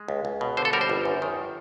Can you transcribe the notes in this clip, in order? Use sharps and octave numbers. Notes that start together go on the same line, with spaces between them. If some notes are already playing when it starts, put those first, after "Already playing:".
Already playing: G#3
C#2
C#2
B2
D3 C5
A4
G3 A#4
C5
G1
F#2
D#3